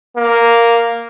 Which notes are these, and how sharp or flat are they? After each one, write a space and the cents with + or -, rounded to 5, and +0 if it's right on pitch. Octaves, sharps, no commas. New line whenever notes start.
A#3 +0